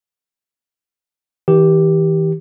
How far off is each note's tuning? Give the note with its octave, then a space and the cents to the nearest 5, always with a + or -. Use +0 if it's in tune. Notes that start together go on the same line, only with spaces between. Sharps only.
E3 -45 G4 +0